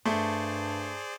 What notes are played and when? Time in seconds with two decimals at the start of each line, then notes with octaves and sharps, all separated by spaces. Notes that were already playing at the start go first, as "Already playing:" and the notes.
0.05 G2 A3 G#4 C5 D5